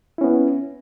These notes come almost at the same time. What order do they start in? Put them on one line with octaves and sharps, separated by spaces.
E4 C#4 B3